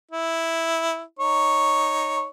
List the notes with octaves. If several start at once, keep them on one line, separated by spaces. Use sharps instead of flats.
E4
D#4 C#5